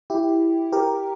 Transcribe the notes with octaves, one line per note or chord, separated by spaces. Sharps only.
E4 G4
G4 A#4